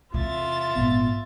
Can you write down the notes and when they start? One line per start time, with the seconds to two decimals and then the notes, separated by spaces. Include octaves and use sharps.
0.14 E2 C3 F4 E5 A6
0.76 G#1 A#2 B3